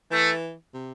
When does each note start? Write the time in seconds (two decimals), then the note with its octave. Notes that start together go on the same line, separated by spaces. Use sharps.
0.11 E3 A3
0.74 C3